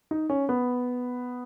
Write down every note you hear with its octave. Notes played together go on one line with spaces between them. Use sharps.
D#4
C#4
B3